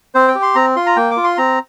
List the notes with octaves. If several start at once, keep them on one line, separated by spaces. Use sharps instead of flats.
C4 C5
G5
G4
C6
C4 A#5
F4 C6
A#5
A#3 G5
D6
F4
C6
C4 A#5